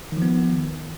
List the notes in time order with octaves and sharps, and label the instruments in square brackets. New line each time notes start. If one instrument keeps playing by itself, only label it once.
[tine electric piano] D#3
F3
B3